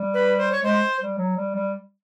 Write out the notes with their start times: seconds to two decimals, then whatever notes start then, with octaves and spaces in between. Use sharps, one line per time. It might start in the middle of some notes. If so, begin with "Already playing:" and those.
Already playing: G3
0.14 B4
0.38 C5
0.52 C#5
0.63 G#3 C5
1.00 G3
1.18 F#3
1.37 G3
1.56 G3